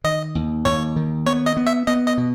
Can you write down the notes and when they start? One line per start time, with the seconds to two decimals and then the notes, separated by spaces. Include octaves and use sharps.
0.04 D#3 D#5
0.35 D#2
0.65 D#2 C#5
0.96 D#3
1.26 B3 C#5
1.46 D#5
1.57 B3
1.67 E5
1.87 B3 D#5
2.07 D#5
2.18 B2